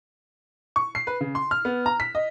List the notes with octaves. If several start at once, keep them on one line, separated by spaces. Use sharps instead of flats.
C#6
C7
B4
C#3
C6
F6
B3
A#5
B6
D#5